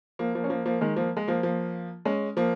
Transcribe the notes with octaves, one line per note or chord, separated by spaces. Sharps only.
F3 A#3
F3 A#3
C#4
F3 A#3
F3 A#3
D#3 G#3
F3 A#3
G#3
F3 A#3
F3 A#3
G#3 C#4
F3 A#3